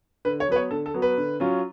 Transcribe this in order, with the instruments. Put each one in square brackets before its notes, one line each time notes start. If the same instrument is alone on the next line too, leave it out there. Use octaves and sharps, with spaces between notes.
[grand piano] D3 B4
C#5
F#3 B3 B4
C#5
D3 A4
A4
F#3 B3
B4
D3
F#3 C#4 F4